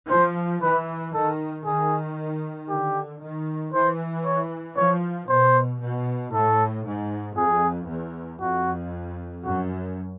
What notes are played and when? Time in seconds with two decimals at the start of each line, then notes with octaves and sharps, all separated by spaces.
0.10 F3 C5
0.62 E3 B4
1.14 D#3 A4
1.65 D#3 G#4
2.69 D3 G4
3.22 D#3
3.73 E3 C5
4.25 C#5
4.77 F3 C#5
5.29 B2 C5
5.81 B2
6.33 A2 A4
6.85 G#2
7.37 F2 G#4
7.89 E2
8.40 F2 F#4
9.44 F#2 F#4